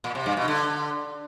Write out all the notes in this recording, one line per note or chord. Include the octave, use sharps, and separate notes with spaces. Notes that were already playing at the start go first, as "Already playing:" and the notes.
A#2
C3
G2
B2
D3